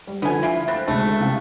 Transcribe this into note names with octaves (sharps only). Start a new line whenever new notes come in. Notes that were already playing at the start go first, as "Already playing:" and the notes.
G3
D3 F3 B3 G#5
E4 F4 C7 D7
C4 B5 F#6 A6
D2 C3 G#3 A3
C3 C4 F5